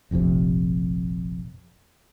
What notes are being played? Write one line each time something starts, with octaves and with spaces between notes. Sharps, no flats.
F1 A#1 F2 C3